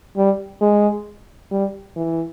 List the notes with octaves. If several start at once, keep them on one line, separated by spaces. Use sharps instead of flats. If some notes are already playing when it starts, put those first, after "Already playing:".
G3
G#3
G3
E3